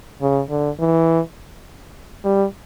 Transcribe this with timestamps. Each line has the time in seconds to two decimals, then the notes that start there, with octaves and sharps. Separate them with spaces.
0.21 C#3
0.50 D3
0.79 E3
2.24 G3